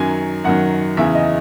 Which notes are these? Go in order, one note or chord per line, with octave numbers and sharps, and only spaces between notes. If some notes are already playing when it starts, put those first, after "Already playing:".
Already playing: F#2 D#3 F#3 G#5
F#2 D#3 F#3 F#5
E2 C#3 E3 E5
D#5